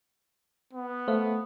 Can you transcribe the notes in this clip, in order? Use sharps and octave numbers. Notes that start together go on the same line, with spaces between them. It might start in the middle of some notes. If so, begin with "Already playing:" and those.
B3
A3 C5 E5 F5